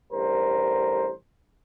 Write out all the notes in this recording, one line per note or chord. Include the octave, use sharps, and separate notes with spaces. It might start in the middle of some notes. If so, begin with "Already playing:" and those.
A1 G2 A#4 C5